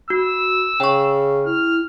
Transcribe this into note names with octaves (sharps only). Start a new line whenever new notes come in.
F#4 E6
C#3 G5 C#6
E4 F6